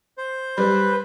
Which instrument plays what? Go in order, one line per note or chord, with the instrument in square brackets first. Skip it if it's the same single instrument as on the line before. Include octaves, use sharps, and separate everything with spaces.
[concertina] C5
[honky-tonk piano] G3 [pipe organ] B4